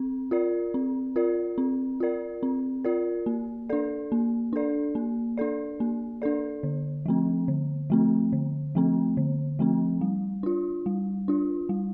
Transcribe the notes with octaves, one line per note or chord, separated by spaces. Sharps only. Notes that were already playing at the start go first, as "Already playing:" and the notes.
Already playing: C4
F4 A#4 D5
C4
F4 A#4 D5
C4
F4 A#4 D5
C4
F4 A#4 D5
A#3
D4 A4 D5
A#3
D4 A4 D5
A#3
D4 A4 D5
A#3
D4 A4 D5
D3
F3 A3 C4
D3
F3 A3 C4
D3
F3 A3 C4
D3
F3 A3 C4
G3
D4 F4
G3
D4 F4
G3